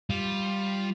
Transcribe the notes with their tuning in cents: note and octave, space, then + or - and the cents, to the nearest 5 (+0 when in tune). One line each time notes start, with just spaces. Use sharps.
G3 +0 F4 +0